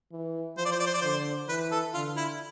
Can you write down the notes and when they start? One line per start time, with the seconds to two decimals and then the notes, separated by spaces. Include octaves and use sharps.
0.12 E3
0.57 F3 C5
0.65 D5
0.72 C5
0.80 D5
0.86 C5
0.94 D5
1.02 D3 C5
1.48 E3 B4
1.72 A4
1.94 D3 F4
2.17 E4